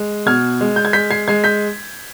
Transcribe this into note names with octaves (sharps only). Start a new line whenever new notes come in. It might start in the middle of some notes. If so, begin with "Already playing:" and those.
Already playing: G#3
B2 F6 G#6
G#3
G6
G#6
G#3 G6 B6
G#6 C7
G#3 G#6 C7
G6 B6